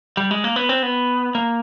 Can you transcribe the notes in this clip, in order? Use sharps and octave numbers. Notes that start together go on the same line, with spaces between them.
G3
G#3
A#3
B3
C4
B3
A#3